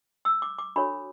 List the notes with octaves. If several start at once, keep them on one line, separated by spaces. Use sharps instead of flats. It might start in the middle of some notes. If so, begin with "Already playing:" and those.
E6
D6
D6
D4 F#4 A4 C#5 B5